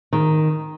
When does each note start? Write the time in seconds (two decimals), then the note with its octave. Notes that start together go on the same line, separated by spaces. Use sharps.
0.13 D#3